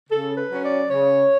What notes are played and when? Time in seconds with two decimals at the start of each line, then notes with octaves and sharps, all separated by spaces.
0.10 C#3 A4
0.36 B4
0.50 F#3 C#4
0.63 D5
0.90 C#3 C#5